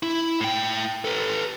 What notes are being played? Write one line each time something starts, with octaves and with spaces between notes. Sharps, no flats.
E4
A2 G5
A4 B4